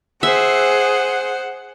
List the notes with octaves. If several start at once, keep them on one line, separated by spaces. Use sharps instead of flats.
G#4 C5 E5 F#5